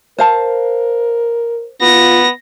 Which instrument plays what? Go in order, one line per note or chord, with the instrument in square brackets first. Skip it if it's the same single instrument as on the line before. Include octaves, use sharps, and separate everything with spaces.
[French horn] A#4 [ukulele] C5 F5 A5
[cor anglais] B3 [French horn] F4 [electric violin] A#6